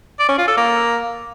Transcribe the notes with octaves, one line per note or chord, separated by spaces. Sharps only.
D5
C#4
F4
A4
A#3